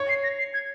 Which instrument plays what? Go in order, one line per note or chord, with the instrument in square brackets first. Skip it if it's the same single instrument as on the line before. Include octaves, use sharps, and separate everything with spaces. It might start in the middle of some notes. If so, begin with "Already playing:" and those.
Already playing: [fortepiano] C#5
[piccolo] C7
A#6
C7
G#6